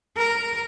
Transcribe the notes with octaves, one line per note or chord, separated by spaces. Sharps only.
A#4